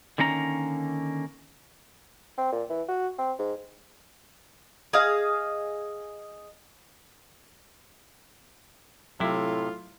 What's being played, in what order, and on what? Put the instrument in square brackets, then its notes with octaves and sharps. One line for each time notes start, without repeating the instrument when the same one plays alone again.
[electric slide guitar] D3 D#3 A#3 C#4 E5 A#5
[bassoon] C4
A#2
E3
F#4
C4
G#2
[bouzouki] G#4 D#5 F5
[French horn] A2 [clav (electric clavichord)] C3 E4 [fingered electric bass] F#3 [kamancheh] F4